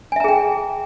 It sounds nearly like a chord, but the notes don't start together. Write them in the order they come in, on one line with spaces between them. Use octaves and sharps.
G#5 E5 A#5 G#4 G5